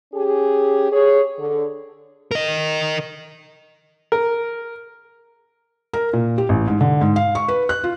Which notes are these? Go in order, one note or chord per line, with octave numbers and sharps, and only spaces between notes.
C#4 G4 G#4
G#4 C#5
D3
A#4 D#5
A#4
A#4
A#2
G4
A1
G#2
D3
G#2
F5
C#6
B4
F#6
F4